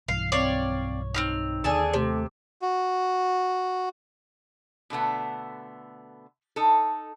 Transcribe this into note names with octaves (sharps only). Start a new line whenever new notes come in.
B1 G2 E3 F5
C4 C#5 D5 F5
C4 D#4 G4 F6
D#2 D3 G#4 A5
C3 A3
F#4
B2 D3 A3 B3
D#4 A4